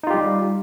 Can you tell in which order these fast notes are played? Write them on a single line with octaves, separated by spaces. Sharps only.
D#4 F4 G4 G3